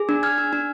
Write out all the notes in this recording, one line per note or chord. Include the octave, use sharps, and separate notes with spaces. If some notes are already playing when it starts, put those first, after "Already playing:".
Already playing: G#4
D4
D4 F6 G#6
D4
D4